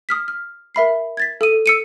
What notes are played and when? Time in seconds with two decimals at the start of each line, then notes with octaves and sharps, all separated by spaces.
0.09 D#6 F6 B6
0.28 F6
0.75 A#4 E5 B5 C7
1.17 G#6 A6 B6
1.41 A4 D#6 D#7
1.66 E6 C#7 D#7